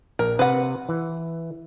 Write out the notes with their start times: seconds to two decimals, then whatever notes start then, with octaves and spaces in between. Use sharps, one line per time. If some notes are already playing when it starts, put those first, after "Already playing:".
0.19 A#1 A#4
0.39 C3 B4 F#5
0.89 E3